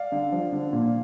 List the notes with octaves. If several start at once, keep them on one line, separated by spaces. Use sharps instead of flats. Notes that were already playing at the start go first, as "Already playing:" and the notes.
Already playing: D5 F5
D3
F3
D3
A#2